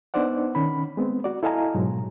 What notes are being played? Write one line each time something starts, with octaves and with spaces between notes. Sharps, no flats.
B3 D4 D#4 C5 D5 F#5
D#3 C#4 B5
G#3 B3 C4
F#4 D5
E4 A4 D#5 F5 G#5 A#5
G#2 B2 F#3 G#3